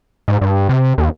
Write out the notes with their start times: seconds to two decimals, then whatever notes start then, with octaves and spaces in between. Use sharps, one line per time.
0.28 G#2
0.41 G2
0.69 C3
0.98 D#2